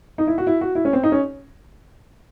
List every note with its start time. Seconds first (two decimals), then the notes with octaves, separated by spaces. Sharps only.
0.18 D#4
0.27 E4
0.38 F#4
0.47 E4
0.61 F#4
0.75 E4
0.85 C#4
0.93 C4
1.03 D#4
1.12 C#4